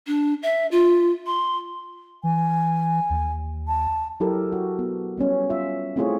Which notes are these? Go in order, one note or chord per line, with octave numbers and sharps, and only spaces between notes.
D4
E5
F4
C6
E3 G#5
D#2
A5
F#3 E4 G4 A4 A#4
F#4
B3
G3 B3 C#4
F4 E5
A3 C4 E4 F4 G#4 C#5